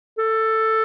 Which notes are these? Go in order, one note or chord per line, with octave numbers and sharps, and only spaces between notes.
A4